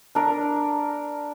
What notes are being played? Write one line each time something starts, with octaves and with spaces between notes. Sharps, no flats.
D4 A#4